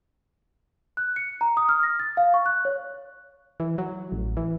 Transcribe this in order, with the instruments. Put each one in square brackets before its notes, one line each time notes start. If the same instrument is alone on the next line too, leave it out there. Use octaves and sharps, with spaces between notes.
[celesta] F#6
C#7
A#5
D#6
F6
A#6
A6
F5
C#6
F#6
C#5
[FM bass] E3
F#3
A1
E3